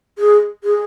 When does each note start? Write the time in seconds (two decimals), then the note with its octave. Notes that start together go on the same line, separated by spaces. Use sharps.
0.18 G#4
0.64 G#4